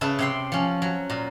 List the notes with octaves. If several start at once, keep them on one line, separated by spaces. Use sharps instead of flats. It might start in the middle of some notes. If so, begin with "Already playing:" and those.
C#3 B4 E5 A5
C3 G5 C6
F3 C#4
F#3
A#2